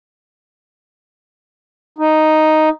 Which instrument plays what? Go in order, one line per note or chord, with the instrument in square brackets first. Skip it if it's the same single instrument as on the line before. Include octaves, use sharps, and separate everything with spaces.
[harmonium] D#4